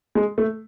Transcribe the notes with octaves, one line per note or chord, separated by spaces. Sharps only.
G#3
A3